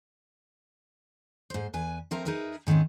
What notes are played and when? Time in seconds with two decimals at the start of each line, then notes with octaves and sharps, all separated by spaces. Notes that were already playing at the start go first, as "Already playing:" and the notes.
1.50 G#2 C5
1.74 E2 B4 G#5
2.11 F3 C4 A#4 B4 E5 A#5
2.25 D#4 G#4 A#4 B4 E5
2.67 G#2 D#3 G#3 C4 C#4